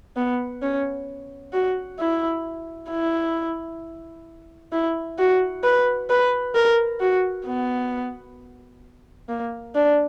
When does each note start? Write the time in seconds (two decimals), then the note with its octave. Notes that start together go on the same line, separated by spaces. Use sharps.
0.16 B3
0.62 C#4
1.53 F#4
1.99 E4
2.90 E4
4.72 E4
5.18 F#4
5.64 B4
6.10 B4
6.55 A#4
7.00 F#4
7.46 B3
9.29 A#3
9.75 D4